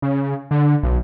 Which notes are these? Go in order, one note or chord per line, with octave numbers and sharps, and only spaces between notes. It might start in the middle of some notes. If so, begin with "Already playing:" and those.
C#3
D3
B1